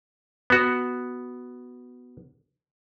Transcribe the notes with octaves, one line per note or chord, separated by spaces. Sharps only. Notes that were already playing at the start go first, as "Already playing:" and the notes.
B3 F#4